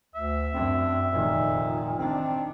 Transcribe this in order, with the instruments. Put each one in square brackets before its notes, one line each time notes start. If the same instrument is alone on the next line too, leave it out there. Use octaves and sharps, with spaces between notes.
[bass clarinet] D2 [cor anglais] E5
[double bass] F#2 D4 [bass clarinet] C4
[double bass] F1 D#3 [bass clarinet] A#2
[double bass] D#3 D4 [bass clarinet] C4